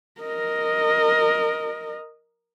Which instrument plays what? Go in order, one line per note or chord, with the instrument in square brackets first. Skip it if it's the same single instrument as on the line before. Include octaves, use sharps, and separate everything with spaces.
[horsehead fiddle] A#4 D#5